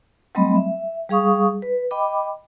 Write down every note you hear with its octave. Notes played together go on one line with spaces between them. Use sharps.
F#3 G3 A3 C4 D#5 B5
E5
G3 G#4 F5 C#6 D#6
B4
D#5 G5 B5 D6